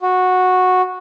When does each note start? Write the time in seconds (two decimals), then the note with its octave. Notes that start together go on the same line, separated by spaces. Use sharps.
0.01 F#4